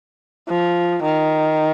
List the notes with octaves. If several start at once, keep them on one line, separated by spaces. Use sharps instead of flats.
F3
D#3